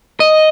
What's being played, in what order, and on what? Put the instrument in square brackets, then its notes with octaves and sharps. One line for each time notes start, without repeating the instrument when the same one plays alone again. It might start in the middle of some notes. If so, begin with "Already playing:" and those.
[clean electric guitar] D#5